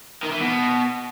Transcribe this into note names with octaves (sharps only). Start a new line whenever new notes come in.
D#3
E3
B2